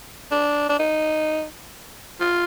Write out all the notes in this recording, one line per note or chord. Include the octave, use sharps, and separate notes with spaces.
D4
D4
D#4
F4